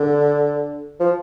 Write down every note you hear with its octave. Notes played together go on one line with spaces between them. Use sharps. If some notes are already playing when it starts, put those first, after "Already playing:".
Already playing: D3
F3